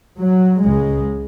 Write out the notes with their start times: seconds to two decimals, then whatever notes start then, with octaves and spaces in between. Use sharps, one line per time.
0.19 F#3
0.63 C#2 C#3 G#3